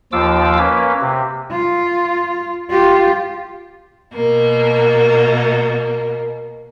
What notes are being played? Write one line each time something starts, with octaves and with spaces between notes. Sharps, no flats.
D#2 F3 F4 D6 E6
A#3 C#4 B4
C3
F4
F4 G4
B2 A#3